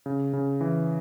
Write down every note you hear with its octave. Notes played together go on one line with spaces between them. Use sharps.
C#3
C#3
E3